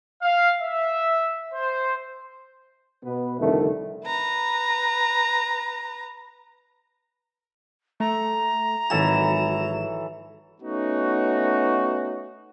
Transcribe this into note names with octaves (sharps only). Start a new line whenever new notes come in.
F5
E5
C5
B2 B3 B4
C2 F2 D3 D#3 A3
B4 A#5
A3 A#5
G#1 E3 F#3 A4 E7
A3 B3 C#4 D#4 F#4